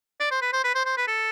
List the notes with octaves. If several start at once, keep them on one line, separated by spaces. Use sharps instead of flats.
D5
C5
B4
C5
B4
C5
C5
B4
A4